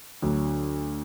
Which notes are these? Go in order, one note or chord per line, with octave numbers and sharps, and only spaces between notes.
D2 D3 F#3